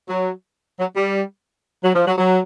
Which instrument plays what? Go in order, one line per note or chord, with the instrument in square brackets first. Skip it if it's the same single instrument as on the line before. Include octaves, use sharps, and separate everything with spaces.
[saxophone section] F#3
F#3
G3
F#3
F3
F#3
F#3